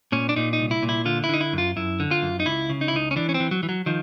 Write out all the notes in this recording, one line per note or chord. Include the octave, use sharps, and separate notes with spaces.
A#2 C#4
D4
A#2 D#4
D#4
C2
E4
A#2
E4
D3 F4
E4
D3 D#4
E4
F#2
F4
F#2 E4
D3
F4
F#2
D#4
C#2 E4
C#3
D#4
E4
C#2 D#4
C#4
E3 D4
C#4
C4
E3
F#3
E3
F#3
D#3 F3